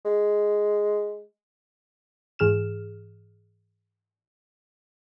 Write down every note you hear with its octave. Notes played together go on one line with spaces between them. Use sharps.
G#3
G#2 E3 G#4 F6 E7